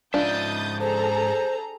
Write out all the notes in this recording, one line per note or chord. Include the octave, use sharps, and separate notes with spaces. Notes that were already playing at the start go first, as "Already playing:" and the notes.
G#2 C#4 D4 F4 E5 D#6 G6 A6
G#4 A4 C5 A#5